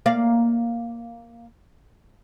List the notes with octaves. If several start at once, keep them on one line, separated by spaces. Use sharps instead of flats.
A#3 D5 F5